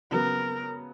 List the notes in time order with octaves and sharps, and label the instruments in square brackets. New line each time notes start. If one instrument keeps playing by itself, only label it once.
[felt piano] C#3 F#3 B3 [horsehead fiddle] A#4